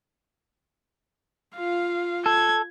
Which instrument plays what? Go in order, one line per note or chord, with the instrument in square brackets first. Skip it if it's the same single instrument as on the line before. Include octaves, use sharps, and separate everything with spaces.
[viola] F4 [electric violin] F5
[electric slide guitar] A4 [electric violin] G#6